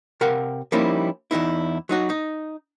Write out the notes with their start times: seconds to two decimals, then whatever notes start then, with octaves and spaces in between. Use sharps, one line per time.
0.21 C3 A#4 F5 F#5
0.72 F3 G3 A#3 C#4 D#4 E4
1.31 E2 G2 D#4 E4
1.89 F#3 D#4 F#4
2.10 D#4